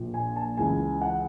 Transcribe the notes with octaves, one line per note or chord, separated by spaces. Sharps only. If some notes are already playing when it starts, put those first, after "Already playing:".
Already playing: A#1 A#2
G#5
A5
C#2 C#3 E3 G#5
F#5